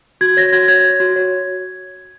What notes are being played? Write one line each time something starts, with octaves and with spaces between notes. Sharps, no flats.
F#4 G#6
C#5 A#6
F#4 G#6
C#5 G#6
C#5
F#4
C#5